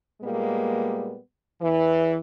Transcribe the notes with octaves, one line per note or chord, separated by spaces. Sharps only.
A#2 G3 G#3 A#3 B3
E2 E3